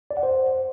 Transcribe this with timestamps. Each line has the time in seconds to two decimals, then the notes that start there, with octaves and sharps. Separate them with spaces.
0.11 D5
0.17 F#5
0.23 C5